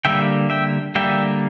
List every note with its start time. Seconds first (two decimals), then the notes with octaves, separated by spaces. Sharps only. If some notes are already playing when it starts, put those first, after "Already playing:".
0.05 D3 G3 A#3 E5 G5
0.50 E5 G5
0.95 D3 G3 A#3 E5 G5